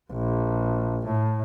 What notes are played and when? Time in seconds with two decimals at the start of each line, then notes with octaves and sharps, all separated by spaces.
0.13 A#1
1.07 A2